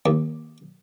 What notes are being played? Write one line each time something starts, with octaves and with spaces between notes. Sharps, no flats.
D#2